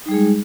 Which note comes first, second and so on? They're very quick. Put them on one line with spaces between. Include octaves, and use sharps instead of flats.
D#4 G3 G#4 G#3